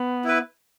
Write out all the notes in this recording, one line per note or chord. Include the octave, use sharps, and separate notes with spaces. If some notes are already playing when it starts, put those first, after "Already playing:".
Already playing: B3
E4 B4